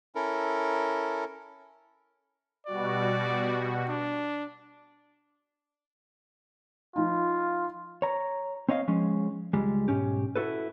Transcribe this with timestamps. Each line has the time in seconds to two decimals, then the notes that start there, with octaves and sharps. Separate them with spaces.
0.15 C#4 E4 A4 A#4
2.67 B2 G3 F#4 D5
3.89 D4
6.96 F3 D#4 F4
8.02 C#5 A#5
8.69 C4 C#5 D#5 F5
8.88 F3 G#3 C#4
9.53 C#2 G3 G#3
9.88 B1 G#2 C#4 G4
10.36 E4 F#4 A4 B4